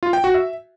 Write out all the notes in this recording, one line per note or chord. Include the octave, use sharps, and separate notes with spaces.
F4
G5
F#4
E5